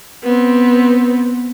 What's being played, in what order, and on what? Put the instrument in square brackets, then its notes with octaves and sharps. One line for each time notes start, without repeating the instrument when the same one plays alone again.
[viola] B3 C4